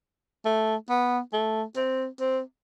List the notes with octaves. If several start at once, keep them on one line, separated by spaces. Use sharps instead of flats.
A3
B3
A3
C4
C4